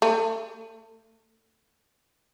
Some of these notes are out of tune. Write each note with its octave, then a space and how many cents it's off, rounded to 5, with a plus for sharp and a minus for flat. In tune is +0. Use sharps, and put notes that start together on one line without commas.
A3 +25